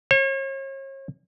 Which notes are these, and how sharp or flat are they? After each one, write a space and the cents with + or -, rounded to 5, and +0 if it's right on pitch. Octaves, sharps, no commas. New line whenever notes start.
C#5 -40